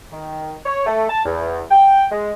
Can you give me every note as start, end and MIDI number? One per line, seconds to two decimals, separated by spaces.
0.12 0.55 51
0.66 0.86 73
0.86 1.05 57
1.09 1.24 81
1.25 1.63 40
1.70 2.06 79
2.12 2.33 56